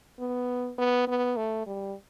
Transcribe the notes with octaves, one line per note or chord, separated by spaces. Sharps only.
B3
B3
B3
A3
G3